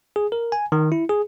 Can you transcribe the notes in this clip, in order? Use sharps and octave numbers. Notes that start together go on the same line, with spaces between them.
G#4
A#4
G#5
D#3
E4
G#4